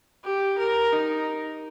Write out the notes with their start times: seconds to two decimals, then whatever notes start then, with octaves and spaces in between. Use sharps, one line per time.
0.24 G4
0.59 A#4
0.93 D#4